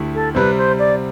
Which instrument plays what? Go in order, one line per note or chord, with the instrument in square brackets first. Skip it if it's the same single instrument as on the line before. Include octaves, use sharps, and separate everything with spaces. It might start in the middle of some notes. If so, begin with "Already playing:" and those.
Already playing: [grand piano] D2 D3 A3 E4 G4
[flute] A4
[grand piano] C3 G3 C4 [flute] B4
[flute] C5
D5